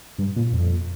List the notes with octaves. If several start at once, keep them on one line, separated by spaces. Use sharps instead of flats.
G2
A#2
F2